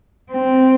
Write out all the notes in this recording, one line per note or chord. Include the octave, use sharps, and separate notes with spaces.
C4